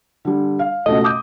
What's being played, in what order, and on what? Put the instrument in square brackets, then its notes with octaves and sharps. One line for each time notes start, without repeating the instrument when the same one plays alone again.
[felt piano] D3 G3
F5
[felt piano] C#2 B2 A3 [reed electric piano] D#5
[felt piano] D6 D#6 G6